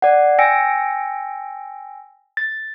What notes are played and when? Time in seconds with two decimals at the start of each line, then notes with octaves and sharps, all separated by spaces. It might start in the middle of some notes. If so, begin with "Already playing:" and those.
0.02 D5 F#5
0.39 G5 G#5 E6 A#6 C#7 D7
2.37 A6